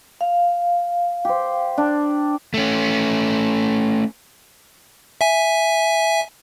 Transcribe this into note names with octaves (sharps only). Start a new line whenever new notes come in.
F5
G4 C5
D4
A3 C#4
E5 G#5